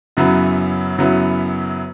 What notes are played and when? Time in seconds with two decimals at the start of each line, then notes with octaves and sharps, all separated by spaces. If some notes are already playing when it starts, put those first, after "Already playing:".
0.17 F#2 C#3 F#3 B3 E4
0.98 F#2 C#3 F#3 B3 E4